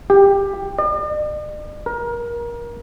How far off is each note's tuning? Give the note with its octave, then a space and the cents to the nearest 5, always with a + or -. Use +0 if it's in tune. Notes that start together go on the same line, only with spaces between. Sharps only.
G4 +15
D5 +45
A#4 +25